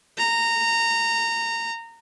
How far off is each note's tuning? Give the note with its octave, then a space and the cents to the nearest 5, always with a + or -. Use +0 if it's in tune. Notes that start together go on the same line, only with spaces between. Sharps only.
A#5 -20